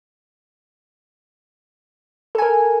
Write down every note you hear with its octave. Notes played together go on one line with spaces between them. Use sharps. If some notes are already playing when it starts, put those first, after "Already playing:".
A4 A#4 G#5